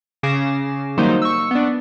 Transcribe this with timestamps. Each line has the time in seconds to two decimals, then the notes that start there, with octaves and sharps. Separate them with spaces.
0.23 C#3 G#5 D6 A#6 C7 E7
0.98 D#3 F#3 G3 A#3 D#4 C5
1.22 C#6 E6
1.51 B3 D4